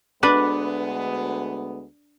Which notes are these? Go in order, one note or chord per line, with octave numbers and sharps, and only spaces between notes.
D2 G#3 B3 D4 B4